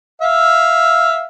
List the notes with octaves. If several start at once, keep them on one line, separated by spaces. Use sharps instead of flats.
E5 F5